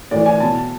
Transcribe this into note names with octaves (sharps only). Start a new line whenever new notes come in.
A2 E3 D5
G#5
B2 A5